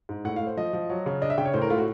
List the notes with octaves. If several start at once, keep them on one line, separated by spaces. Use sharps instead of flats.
G#2
A2 F#5
F5
A3
C5
F3 D#5
F3
F#3
C#3
D4 D#5
E5
C#3 G5
C#5
A2 C5
A#4
A3 F4
F#4